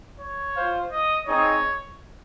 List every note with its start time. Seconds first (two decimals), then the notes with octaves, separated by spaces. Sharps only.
0.19 C#5
0.55 F4 C5 F5
0.91 D#5
1.26 C4 D#4 G#4 C#5 D#5